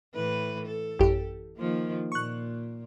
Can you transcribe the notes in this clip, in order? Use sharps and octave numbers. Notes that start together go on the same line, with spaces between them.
A2 E3 B4
A4
A1 F#2 G4
D#3 F3 A#3
A#2 C#6 F#6